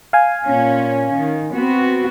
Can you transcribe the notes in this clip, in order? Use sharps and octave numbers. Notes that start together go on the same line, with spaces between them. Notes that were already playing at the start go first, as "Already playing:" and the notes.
F5 G#5
A#2 C#4
D#3
B3 C4 F#4